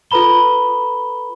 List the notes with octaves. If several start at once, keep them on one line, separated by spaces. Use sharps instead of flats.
F4 A4 B4 A#5 B5 G7